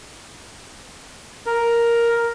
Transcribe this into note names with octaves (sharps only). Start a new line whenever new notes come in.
A#4